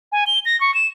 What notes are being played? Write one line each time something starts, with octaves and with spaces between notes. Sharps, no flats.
G#5
G7
A#6
C#6
E7